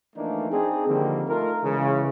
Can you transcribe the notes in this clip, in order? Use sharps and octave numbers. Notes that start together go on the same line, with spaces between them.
E3 F3 A3 A#3 D4 D#4
C4 D4 D#4 G#4
D3 D#3 F3 G3 A#3 C4
A3 D#4 F4 A#4
C#3 E3 G#3